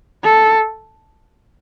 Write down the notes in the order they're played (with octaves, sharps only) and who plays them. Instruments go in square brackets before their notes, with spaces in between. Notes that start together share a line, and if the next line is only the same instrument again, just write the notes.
[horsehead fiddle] A4